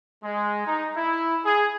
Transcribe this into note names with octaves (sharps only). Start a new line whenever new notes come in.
G#3
D#4
E4
G#4